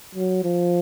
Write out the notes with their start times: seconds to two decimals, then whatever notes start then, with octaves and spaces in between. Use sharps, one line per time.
0.15 F#3
0.44 F3